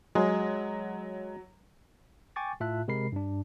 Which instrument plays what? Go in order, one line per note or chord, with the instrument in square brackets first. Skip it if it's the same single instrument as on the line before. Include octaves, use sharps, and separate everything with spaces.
[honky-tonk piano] F#3 [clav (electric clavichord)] G#3
[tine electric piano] G5 G#5 C#6 D6 A6
A2 F4 E5 A5 F#6
C3 G#3 A#4 B5 C7
G2 D4